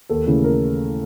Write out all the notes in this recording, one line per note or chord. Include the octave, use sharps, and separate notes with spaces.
D#2 A4
C#3 E3 A3
A#4